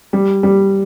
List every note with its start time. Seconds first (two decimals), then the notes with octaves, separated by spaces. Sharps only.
0.13 G3
0.43 G3